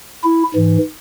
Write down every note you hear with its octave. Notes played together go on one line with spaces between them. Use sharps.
E4
G#2 E3